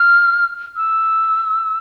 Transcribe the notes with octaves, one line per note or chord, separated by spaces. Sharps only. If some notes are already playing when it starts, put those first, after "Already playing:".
Already playing: F6
E6